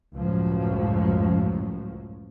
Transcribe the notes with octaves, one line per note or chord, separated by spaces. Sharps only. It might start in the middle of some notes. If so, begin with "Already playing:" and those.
C#2 F#2 A2 F3 F#3